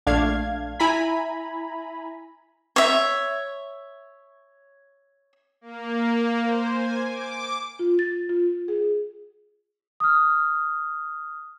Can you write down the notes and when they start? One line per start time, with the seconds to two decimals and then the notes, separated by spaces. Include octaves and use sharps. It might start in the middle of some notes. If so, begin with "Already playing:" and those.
0.06 A#1 A3 D4 F5 G#6
0.80 E4 G#5 A#5 B5
2.76 C#5 E5
5.61 A#3
6.43 C5
6.73 G#5
7.09 D6
7.79 F4
7.99 A6
8.29 F4
8.68 G#4
10.00 D#6 F6